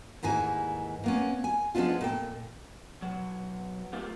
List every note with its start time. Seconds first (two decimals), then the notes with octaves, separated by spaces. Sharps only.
0.23 D#2 G#2 E3 G#5
1.04 A#3 B3 C#4
1.44 G#5
1.75 F3 G#3 B3 C#4 D4 F4
2.01 A#2 A4 G5
3.02 B2 F#3
3.93 A3 A#3 F4 G4 A#4